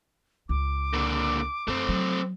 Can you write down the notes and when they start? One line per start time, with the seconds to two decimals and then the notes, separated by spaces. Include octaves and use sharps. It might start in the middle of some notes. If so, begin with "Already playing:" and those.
0.49 C#2 D6
0.93 A#2 D3
1.68 F#2 A3 C4
1.89 F#3